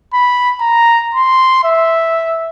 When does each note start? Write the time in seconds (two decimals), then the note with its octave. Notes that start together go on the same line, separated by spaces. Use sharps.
0.13 B5
0.60 A#5
1.14 C6
1.64 E5